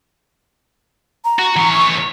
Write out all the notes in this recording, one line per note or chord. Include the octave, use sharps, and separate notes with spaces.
A#5
F#4
E3 C#5
C#6